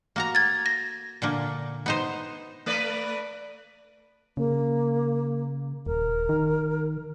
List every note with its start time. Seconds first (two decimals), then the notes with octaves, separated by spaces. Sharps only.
0.16 A#3 F#4 A#5
0.35 G#6 A6
0.66 A#6
1.22 A#2 D3 A#3
1.86 B3 D#4 C5
2.66 A3 B4 D5
4.37 C#3 A#3
5.86 D#1 A#4
6.29 D#3